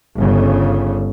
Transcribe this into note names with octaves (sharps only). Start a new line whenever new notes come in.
G1 C#3